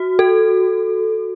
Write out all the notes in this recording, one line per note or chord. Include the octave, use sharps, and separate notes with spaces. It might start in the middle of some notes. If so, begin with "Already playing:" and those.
Already playing: F#4
A4